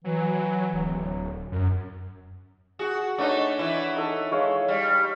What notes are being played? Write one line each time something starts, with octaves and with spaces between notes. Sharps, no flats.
E3 F#3
D1 F#3
F#2
F#4 G#4
A3 D4 D#4 C#5 F#5
E3 E4
D#4 A4
G#3 C#5 F5
G3